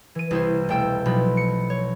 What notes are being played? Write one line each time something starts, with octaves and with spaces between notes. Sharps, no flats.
E3 D#7
C2 E4 C5
E1 A3 G5 E6 G6
B1 B2 F3 B5
C#7
C#5